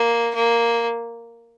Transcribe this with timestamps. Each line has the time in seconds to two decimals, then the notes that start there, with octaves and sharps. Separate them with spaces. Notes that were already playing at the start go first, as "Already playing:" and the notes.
Already playing: A#3
0.35 A#3